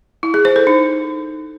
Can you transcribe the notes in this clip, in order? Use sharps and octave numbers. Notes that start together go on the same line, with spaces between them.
E4
G#4
C5
A4
D#4